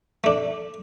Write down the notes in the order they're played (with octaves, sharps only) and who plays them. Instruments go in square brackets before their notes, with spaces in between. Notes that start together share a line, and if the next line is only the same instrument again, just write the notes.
[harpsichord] A3 D4